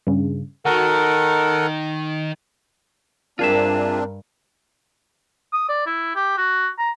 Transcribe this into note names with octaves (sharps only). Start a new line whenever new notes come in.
G2 C#3
D#3 F#4 A4 A#4 F#5
G2 C4 D4 F4 G#4 A#4 E5
D#6
D5
E4
G4
F#4
A#5